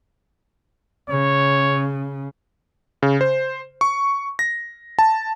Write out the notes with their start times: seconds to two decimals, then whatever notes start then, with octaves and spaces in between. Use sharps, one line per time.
1.10 C#3 C#5
3.03 C#3
3.21 C5
3.81 C#6
4.39 A#6
4.99 A5